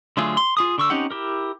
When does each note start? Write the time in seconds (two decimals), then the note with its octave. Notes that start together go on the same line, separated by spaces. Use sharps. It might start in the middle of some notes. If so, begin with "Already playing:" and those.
0.17 D3 F#3 A3 F4 G#4
0.37 C6
0.57 F4 G#4 D#6
0.78 D3 C#6 E6
0.90 C4 C#4 D#4 G4 F#5
1.10 E4 G4 A#4